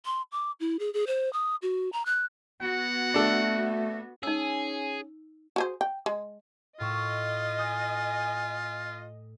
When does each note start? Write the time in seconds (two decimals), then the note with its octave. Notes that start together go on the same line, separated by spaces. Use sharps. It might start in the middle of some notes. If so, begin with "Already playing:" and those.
0.05 C6
0.32 D6
0.60 E4
0.79 G#4
0.94 G#4
1.07 C5
1.33 D#6
1.62 F#4
1.93 A#5
2.06 F#6
2.61 B3 F#4 F#5
3.14 A3 D4 A4
4.23 C#4 D#4 G#4 E6
5.56 F#4 G#4 C5
5.81 G5
6.06 G#3
6.80 A2 F4 D#5 C#6 E6
7.59 G#5 D#6 G6